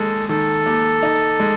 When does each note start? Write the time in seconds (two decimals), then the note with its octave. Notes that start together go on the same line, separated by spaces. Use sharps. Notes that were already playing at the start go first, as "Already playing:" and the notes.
Already playing: D#2 G#3 A4
0.29 D#3 A4
0.66 D#2
1.03 D#4
1.40 G#3